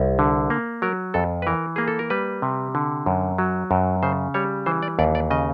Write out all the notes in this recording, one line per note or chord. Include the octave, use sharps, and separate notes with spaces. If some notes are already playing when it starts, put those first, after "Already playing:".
Already playing: C2
D3
A#3
F#3 A#4
F2 A4
B4
E3 A#4
A#3 G#4
A4
A#4
G3 B4
C3
D3
F#2
F#3
F#2
C#3 C5
G3 C#5
E3 C5
D5
D#2 D5
D5
C#3 D#5